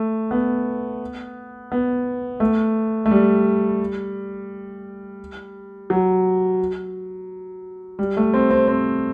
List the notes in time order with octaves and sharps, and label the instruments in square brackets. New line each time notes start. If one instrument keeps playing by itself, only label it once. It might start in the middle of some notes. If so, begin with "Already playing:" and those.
Already playing: [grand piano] A3
B3
B3
A3
A3
G3
F#3
G3
A3
C4
C4
C4